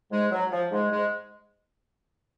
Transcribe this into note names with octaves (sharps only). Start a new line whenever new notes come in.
G#2 G#3
F#3
F3
G#2 G#3
G#2 G#3